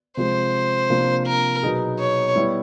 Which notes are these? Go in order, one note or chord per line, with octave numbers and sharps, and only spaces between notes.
C3 F3 G#3 C5
C3 F3 A#3 D4
A#4
B2 F#3 B3 D#4 G#4
C#5
G3 B3 E4